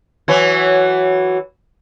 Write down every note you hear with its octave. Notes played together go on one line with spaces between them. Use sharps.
E3 F#3